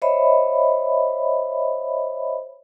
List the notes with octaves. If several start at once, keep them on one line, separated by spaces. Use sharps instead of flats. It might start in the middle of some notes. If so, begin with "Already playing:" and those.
C5 C#5 D#5 E5 B5